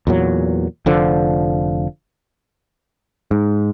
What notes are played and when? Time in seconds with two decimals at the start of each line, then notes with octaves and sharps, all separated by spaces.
0.07 E2 A#2 F#3
0.86 F1 D3 F3
3.31 G#2